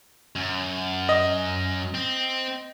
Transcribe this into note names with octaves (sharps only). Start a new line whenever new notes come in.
F#2
D#5
C4